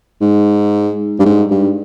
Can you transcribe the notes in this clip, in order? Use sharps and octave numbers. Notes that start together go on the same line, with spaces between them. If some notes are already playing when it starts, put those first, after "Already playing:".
G#2
G2
G#2
G2